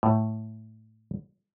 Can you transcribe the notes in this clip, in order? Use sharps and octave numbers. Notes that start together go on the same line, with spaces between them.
A2